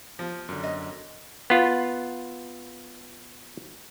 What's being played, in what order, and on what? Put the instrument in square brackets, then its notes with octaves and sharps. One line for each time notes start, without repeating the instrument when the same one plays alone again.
[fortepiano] F3
[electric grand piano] F#2 D3
[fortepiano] D#5
[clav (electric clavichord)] B3 F4